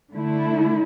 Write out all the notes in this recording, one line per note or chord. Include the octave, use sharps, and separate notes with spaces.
D3 A3 E4